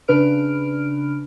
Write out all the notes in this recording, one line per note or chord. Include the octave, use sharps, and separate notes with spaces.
C#3 D4 B4 F6 D7